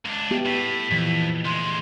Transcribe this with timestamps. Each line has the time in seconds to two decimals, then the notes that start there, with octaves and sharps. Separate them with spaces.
0.05 C#2 D4
0.31 B3 G4 E5
0.46 A2 B6
0.91 F2 A#2 E3 F3
1.45 D2 G#3 C6